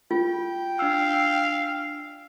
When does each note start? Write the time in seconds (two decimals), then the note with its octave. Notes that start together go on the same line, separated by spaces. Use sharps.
0.11 F4 G5
0.79 D4 F5 E6